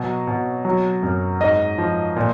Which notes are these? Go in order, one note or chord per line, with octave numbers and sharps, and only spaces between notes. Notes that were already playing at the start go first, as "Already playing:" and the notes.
Already playing: B2 F#3
B2
F#3
F#2
G#2 D#5
F3
A#2